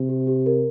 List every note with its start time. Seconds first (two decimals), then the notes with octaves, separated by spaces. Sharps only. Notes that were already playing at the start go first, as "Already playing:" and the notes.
Already playing: C3
0.09 G4
0.27 G4
0.46 A#4